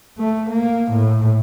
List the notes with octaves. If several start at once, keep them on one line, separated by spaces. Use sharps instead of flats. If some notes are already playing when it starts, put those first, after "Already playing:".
A3
A#3
A2